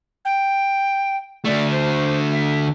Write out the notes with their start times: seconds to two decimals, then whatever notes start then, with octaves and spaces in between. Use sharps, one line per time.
0.24 G5
1.45 D3 A3 D5
1.70 C5
2.32 E5